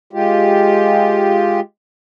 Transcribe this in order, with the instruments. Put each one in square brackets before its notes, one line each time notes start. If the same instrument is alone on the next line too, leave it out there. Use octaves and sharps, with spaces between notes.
[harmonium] G#3 F4 G4